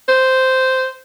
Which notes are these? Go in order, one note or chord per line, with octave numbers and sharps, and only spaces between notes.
C5